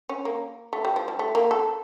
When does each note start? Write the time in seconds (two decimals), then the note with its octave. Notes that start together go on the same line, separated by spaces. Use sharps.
0.09 C#4
0.25 A#3
0.73 A3
0.85 G3
0.96 F3
1.08 G3
1.19 A3
1.35 A#3
1.51 A4